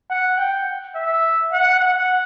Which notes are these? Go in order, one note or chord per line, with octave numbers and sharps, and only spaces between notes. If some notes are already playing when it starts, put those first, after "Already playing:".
F#5
G5
E5
F#5
F#5